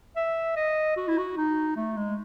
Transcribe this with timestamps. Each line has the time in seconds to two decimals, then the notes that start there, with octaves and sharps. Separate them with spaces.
0.16 E5
0.56 D#5
0.96 F#4
1.08 E4
1.18 F#4
1.37 D#4
1.76 A3
1.97 G#3